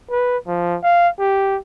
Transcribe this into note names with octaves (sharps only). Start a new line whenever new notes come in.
B4
F3
F5
G4